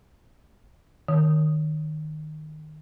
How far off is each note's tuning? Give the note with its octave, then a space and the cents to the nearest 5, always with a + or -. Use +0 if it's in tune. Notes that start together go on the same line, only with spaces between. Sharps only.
D#3 -15